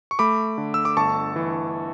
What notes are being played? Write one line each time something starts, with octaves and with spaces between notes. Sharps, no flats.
C#6
A3 B5 D6
D3
E6
D6
G1 A5 C#6
E3